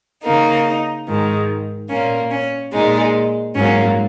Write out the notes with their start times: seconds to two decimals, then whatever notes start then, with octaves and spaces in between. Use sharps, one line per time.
0.23 C#3 A#3 D#4
1.06 G#2 D#3 G#3
1.88 A#2 A#3 C#4
2.30 C#4
2.71 A#2 G#3 D#4
3.54 G#2 F#3 A#3 C#4